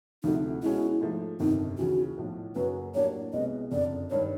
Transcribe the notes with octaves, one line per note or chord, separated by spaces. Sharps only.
D2 C3 F3 A3 D#4
B2 G#3 C#4 E4 F#4
G#2 F3 A3
G1 F2 C3 D#3 D#4
D#2 C#3 E3 F#4
B1 A2 F3
F#2 C#3 F#3 A#3 B4
A2 F#3 A#3 D4 G4 C#5
C2 B2 G#3 B3 D#5
F#1 F2 D3 D5
G2 D#3 G3 C#5